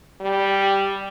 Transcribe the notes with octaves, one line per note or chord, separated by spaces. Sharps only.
G3